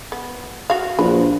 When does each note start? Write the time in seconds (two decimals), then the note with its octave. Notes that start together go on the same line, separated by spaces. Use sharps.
0.12 B3
0.70 F#4 F5
0.99 A#1 B4